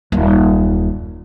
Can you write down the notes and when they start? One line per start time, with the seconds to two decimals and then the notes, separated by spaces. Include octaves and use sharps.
0.12 D#1 F#2